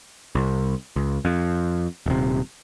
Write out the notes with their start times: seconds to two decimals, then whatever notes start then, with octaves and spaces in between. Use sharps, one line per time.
0.35 C2
0.96 C#2
1.25 F2
2.06 D#1 C3